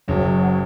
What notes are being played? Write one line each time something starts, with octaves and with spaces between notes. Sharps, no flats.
F#1 F#3